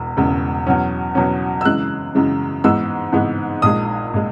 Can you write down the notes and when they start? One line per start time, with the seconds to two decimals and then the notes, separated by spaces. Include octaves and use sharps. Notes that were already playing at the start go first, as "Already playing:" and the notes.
Already playing: E1 E2
0.17 E1 E2 C#3 G#3
0.67 E2 B2 F#3 C#4
1.15 E2 B2 F#3 C#4
1.61 E6
1.65 F#2 C#3 E3 G#3 F#6
2.15 F#2 C#3 E3 G#3
2.64 G#2 E3 G#3 B3 E6
3.12 G#2 E3 G#3 B3
3.62 A#1 A#2 G#3 D#6
4.14 A#2 G#3